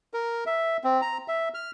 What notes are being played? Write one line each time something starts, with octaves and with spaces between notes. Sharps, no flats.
A#4
E5
C4
A#5
E5
F6